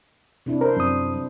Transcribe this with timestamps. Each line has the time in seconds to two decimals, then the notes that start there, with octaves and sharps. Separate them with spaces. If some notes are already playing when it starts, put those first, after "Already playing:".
0.46 C3 D4 E4
0.61 C4 A#4 C5
0.76 F#2 D#6